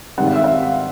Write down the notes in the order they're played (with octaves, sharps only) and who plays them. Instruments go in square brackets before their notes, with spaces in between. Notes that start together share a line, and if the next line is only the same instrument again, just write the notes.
[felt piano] G#2 D#3 G3 C4 F#5
F5
E5
F5